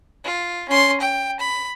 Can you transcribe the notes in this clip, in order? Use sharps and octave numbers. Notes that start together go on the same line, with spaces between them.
F4
C#4 C6
G5
B5